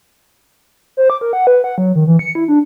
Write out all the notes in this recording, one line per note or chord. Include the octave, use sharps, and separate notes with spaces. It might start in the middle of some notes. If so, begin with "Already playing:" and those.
C5
D6
A#4
F#5
B4
F#5
F#3
D#3
E3
C#7
E4
D4